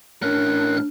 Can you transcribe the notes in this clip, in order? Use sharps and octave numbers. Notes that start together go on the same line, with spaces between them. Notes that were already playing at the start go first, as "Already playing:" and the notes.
A2 C#4 D4 A#4 F#6